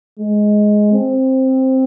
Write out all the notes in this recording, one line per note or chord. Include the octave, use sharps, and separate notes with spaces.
G#3
C4